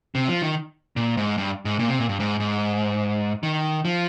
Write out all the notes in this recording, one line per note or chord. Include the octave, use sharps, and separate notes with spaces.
C3
F3
D#3
A#2
G#2
G2
G#2
A#2
C3
A#2
G2
G#2
G#2
D#3
F3